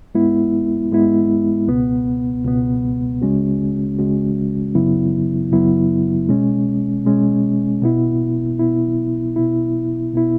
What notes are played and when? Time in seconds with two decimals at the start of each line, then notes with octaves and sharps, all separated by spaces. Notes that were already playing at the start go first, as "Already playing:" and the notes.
0.14 G#2 G#3 B3 E4
0.92 G#2 G#3 B3 E4
1.68 C#2 B2 B3
2.45 C#2 B2 B3
3.21 C#2 C#3 G#3 C#4 F#4
3.99 C#2 C#3 G#3 C#4 F#4
4.75 F#2 C#3 F#3 B3 E4
5.52 F#2 C#3 F#3 B3 E4
6.29 B2 G#3 C#4
7.05 B2 G#3 C#4
7.82 B2 B3 E4
8.59 B2 B3 E4
9.36 B2 B3 E4
10.13 B2 B3 E4